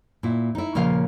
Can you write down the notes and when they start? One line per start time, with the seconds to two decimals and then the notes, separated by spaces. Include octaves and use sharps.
0.23 A#2 E4
0.55 D#4 E4
0.75 A#2 C#3 F3 F5